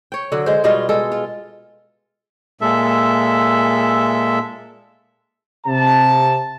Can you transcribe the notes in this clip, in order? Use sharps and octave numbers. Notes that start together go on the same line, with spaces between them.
C#5 G5
D3 F#3
G#3 C5
B2 G3 G#3 F4
G#3 A4
F4
A#2 G#3 A4 E5
C3 A5